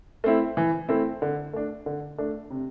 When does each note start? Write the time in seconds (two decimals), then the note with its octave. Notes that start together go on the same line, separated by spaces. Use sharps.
0.24 A3 C4 E4
0.57 E3
0.89 A3 C4 E4
1.22 D3
1.53 A3 D4
1.86 D3
2.18 A3 D4
2.50 C3